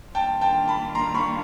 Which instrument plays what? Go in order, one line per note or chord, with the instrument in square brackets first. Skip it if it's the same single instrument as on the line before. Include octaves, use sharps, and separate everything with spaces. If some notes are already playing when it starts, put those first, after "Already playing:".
[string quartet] D#3 G3 A#3 D4 F4 [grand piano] G5 A5
[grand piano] G5 A5
A5 B5
A#5 C6
B5 C#6